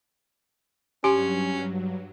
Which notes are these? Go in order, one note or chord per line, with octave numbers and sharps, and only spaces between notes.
G2 F#3 C#4 G4 G#5 C6